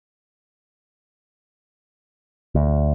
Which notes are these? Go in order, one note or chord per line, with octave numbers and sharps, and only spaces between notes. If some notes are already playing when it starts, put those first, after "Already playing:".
D2